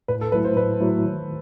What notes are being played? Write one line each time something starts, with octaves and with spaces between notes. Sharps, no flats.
A2 B4
A4
F#3 A3 E4 B4
C5
A2 B4
F#3 A3 E4
D#3